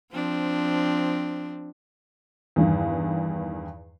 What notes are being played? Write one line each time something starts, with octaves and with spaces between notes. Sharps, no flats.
F3 C4 D4
E2 G2 D#3